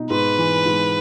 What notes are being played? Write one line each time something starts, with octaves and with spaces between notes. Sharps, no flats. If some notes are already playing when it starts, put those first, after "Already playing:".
Already playing: B2 D#4
G#2 B4
E3
G#2